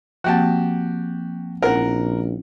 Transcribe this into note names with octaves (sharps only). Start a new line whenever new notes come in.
F3 A#3 C4 F#4 G4 A5
A#1 C4 C#4 E4 A#4 F#5